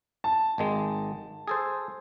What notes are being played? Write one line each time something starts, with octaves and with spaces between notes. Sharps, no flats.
A5
G#1 D#3 G#3
G#4 A4 C5